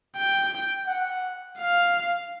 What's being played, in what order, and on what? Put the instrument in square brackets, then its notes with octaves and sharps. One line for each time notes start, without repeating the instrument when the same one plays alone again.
[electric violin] G5
[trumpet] F#5
[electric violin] F5